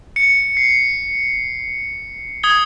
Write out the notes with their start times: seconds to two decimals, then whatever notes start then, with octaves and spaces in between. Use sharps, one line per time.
0.16 C#7
0.57 C7
2.43 D#6 G#6 G7